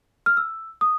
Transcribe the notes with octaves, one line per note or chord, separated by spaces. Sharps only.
F6
E6
D#6